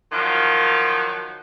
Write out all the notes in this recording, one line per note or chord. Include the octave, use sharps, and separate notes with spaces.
D#3 F3 F#3